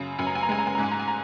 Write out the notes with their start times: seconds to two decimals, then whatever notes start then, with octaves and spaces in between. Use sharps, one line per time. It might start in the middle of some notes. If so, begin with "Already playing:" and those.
Already playing: F#2 C#3
0.19 F#2 G#5
0.27 A#5
0.35 G#5
0.43 A#5
0.49 G#3 G#5
0.59 A#5
0.67 G#5
0.75 A#5
0.78 G#2 G#5
0.91 A#5
0.99 G#5
1.08 A#5